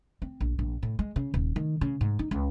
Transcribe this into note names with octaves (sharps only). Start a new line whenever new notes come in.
C4
A#1
A#1
A2
G#3
C#3
D#1
D#3
C#3
G#2
D#4
C#2